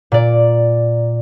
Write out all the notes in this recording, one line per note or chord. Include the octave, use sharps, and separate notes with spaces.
A#2 D5